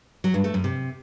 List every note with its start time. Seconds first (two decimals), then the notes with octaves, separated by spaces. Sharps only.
0.24 F#3
0.34 G2
0.44 A3
0.54 F#2
0.64 C3